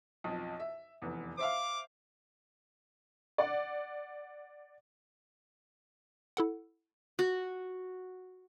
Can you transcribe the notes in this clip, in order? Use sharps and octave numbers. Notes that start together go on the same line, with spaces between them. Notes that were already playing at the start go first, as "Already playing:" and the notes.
B1 F2
E5
F1 E2
C5 E5 F5 D6
D5 F#5
E4 A4 F#5
F#4